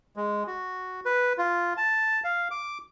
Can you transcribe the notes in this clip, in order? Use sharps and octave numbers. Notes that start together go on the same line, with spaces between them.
G#3
F#4
B4
F4
A5
F5
D6